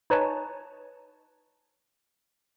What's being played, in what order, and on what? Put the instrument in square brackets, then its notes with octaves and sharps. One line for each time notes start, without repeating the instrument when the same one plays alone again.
[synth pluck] D#4 B4 C#5 G#5 A5